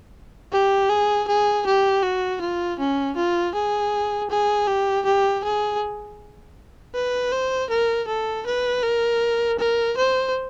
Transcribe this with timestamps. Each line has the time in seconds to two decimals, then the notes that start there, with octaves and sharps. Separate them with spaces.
0.52 G4
0.90 G#4
1.27 G#4
1.66 G4
2.03 F#4
2.41 F4
2.80 C#4
3.16 F4
3.55 G#4
4.30 G#4
4.67 G4
5.06 G4
5.44 G#4
6.95 B4
7.32 C5
7.70 A#4
8.08 A4
8.46 B4
8.83 A#4
9.59 A#4
9.97 C5